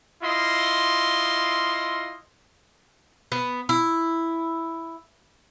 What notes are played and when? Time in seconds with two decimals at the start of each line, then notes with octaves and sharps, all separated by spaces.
0.23 E4 F4 D#5 C6
3.32 B3
3.69 E4